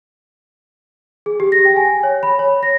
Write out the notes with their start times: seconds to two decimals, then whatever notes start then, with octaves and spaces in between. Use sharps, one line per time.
1.26 G#4
1.40 G4
1.52 A#6
1.65 G5
1.77 G#5
2.03 C#5
2.23 B5
2.39 C#5
2.63 A#6